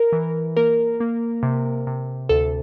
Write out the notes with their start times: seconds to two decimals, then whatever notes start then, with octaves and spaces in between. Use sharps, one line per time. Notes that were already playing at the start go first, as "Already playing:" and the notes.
Already playing: A#4
0.12 E3
0.57 A#3 A#4
1.00 A#3
1.43 C3
1.87 C3
2.29 D2 A4